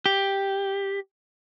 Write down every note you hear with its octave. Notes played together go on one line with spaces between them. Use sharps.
G4